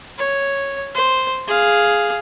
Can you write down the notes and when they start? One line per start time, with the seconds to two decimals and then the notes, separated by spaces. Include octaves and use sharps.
0.18 C#5
0.95 C5
1.47 G#4 F5